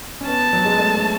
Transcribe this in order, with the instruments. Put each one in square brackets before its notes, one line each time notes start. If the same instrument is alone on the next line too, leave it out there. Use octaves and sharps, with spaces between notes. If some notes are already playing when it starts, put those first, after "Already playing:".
[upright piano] C#4
[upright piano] B3 [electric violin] A5
[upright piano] F#3
G#3
A3
A3